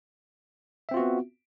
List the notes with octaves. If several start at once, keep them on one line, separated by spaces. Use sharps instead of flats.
B3 C4 F4 F#4 E5